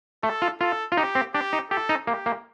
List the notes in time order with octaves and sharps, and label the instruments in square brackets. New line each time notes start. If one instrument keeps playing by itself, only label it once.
[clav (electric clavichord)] A3 [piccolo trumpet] A4
[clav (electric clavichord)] F4
[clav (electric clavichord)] F4 [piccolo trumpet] A4
[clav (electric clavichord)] F4
[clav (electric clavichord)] D#4 [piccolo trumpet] G4
[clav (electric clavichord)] C4
[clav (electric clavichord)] D4 [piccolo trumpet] G4
[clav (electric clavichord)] D#4
[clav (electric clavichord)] G4 [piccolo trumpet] A4
[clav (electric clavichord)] D#4
[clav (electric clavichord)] A#3 [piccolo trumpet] G4
[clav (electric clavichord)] A#3